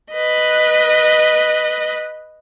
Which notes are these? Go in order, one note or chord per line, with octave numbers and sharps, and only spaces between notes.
B4 D#5